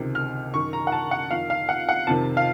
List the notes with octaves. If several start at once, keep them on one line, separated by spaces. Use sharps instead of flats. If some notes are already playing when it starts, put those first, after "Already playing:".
Already playing: C#2 C3 D#3
F6
F#2 D#3 C#6
A#5
F#5
A5
F#5
F2 D#3 F5
F5
F#5
F#5
F2 C3 D#3 A5
F5